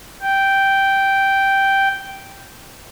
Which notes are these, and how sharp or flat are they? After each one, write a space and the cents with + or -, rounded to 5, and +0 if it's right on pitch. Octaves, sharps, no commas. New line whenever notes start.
G5 -5